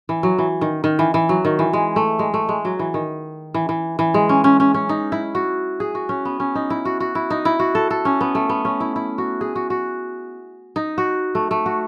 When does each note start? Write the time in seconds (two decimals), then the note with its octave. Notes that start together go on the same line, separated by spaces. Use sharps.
0.09 E3
0.23 F#3
0.38 E3
0.61 D#3
0.84 D#3
0.99 E3
1.14 E3
1.29 F#3
1.45 D#3
1.59 E3
1.73 G#3
1.96 A3
2.19 G#3
2.34 A3
2.49 G#3
2.65 F#3
2.79 E3
2.94 D#3
3.54 E3
3.69 E3
3.99 E3
4.14 G#3
4.29 C#4
4.44 C#4
4.60 C#4
4.74 C#4
4.89 D#4
5.12 E4
5.35 F#4
5.80 G#4
5.95 F#4
6.09 C#4
6.25 B3
6.40 C#4
6.55 D#4
6.70 E4
6.85 F#4
7.00 F#4
7.15 E4
7.30 D#4
7.45 E4
7.59 F#4
7.75 A4
7.91 A4
8.05 C#4
8.21 B3
8.35 A3
8.49 B3
8.65 C#4
8.80 E4
8.96 E4
9.18 F#4
9.41 G#4
9.55 F#4
9.70 F#4
10.76 D#4
10.98 F#4
11.35 A3
11.51 A3
11.66 F#4